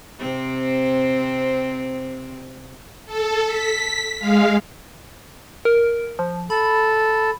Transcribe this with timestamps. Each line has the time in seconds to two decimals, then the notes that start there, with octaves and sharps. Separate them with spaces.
0.19 C3 C4
3.06 A4
3.47 B6
4.19 G#3 F5
5.65 A#4
6.19 F3
6.50 A4 B5